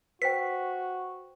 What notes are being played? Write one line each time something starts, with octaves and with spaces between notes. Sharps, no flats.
F#4 B4 C5 G5 B6